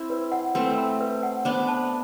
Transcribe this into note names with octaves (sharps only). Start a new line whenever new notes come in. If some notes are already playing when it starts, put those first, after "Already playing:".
Already playing: C4 E4
B4
F#5
A3 C4 B4
B5
B4
F#5
B3 D4 C5
A5